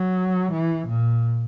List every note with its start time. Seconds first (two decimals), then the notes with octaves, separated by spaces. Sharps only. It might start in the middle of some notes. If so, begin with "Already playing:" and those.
Already playing: F#3
0.51 E3
0.87 A#2